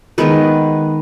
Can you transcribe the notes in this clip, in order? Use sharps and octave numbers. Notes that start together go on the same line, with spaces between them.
D#3 G#3 B3 B4